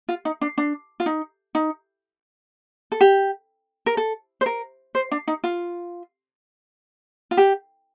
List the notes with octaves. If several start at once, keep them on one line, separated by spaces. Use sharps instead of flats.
F4
D#4
D4
D4
F4
D#4
D#4
A4
G4
A#4
A4
C5
A#4
C5
D4
D#4
F4
F4
G4